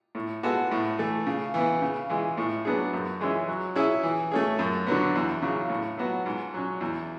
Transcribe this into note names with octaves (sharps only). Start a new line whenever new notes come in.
A2
G#3 B3 F#4 A4
A2
E3 A3
C#3
E3 B3
C#3
E3 G#3
A2
F#3 B3 D4 G#4
F#2
E3 G#3 C#4 E4
F#3
C#4 E4 G#4
E3
A3 C#4 G#4
F#2
D3 F#3 B3
E2
C#3 F#3
A2
F#3 B3 F#4
G#2
F#3 C#4
E2